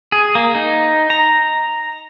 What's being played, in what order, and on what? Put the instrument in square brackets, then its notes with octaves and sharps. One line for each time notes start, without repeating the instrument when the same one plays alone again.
[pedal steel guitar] G#4
A#3
D#4
A#5